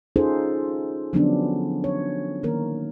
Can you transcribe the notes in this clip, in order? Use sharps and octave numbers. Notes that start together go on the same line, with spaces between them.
C#4 D#4 F4 G#4 A4 C5
D3 F3 F#3 B3 C#4 D4
C#5
D#3 A#3 A#4